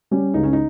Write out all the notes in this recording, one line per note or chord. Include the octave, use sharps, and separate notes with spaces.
G3 C#4 G4
C#2 D#4
C#4
D#4